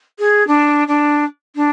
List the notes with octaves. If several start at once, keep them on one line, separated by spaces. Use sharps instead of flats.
G#4
D4
D4
D4